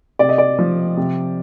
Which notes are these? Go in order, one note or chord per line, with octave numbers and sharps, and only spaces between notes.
C3 D5
D#5
D5
F3
C3